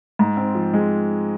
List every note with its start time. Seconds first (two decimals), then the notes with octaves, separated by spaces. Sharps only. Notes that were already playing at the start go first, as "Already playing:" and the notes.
0.19 G#2
0.37 C4
0.55 F3
0.74 G#3